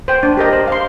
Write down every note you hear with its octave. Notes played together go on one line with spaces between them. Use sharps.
C5 G5
D4
G4 A#4 D#5
C5
F5 C6